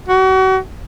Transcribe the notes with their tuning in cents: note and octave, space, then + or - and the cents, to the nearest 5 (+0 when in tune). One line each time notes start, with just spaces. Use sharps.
F#4 +35